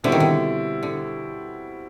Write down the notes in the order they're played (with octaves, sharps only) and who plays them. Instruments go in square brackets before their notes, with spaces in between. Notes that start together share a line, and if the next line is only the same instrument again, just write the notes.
[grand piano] B2 G3 C4 E4 [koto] D3
[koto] D#3
D3
D3